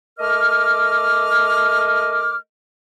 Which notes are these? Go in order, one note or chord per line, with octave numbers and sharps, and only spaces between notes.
A3 A#4 D#5 D6 F6